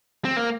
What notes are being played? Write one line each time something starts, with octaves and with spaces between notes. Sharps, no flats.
C4
A#3